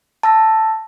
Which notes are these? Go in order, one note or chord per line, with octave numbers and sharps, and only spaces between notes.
A5 E6 A#6